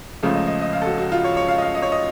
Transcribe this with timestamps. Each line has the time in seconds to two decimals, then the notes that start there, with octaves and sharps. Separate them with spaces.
0.22 C#2 C#3 F3 A3 F5
0.35 D#5
0.48 D#5
0.61 D#5
0.73 F5
0.82 A4
0.86 F#4
0.98 F#4
1.12 F4
1.24 C#5
1.37 C#5
1.48 F5
1.58 D#5
1.62 F5
1.75 D#5
1.82 C#5
1.92 D#5